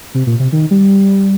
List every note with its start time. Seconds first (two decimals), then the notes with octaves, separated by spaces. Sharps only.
0.15 C3
0.27 A#2
0.39 C3
0.52 D#3
0.71 G3